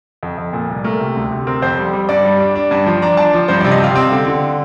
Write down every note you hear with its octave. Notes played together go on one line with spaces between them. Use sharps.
F2
F2
A#2
C2
A3 A#4
C3
D2
C3
C4 A#4
F2 C5
G3
G3
G2 D5
G3
D4
D4
G2
F3
D4 A#5
D4 A5
F3
G2 C5
C3 D5
D#5
C3 F5
C4 G5
D3
D3